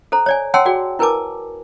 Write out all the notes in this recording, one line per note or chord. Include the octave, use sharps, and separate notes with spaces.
A4 C5 A#5
C#5 D5 G#5
C#5 F#5 G5 A5 C6 E6
F#4 G#4 D5 G5
E4 A#4 B4 G#5 A5 D6